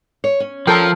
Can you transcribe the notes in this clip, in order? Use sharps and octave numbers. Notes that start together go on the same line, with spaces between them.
C#5
C#4
F3 A4 A#4 G5